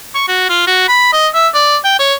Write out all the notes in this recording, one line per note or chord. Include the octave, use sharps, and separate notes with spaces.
C#6
F#4
F4
F#4
B5
D#5
E5
D5
G5
C#5